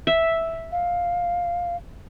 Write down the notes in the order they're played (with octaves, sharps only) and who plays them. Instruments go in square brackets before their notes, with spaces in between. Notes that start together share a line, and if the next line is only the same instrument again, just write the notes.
[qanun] E5
[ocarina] F5